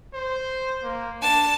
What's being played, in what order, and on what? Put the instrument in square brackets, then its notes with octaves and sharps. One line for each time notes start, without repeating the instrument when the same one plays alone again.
[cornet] C5
A#3
[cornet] D4 [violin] A5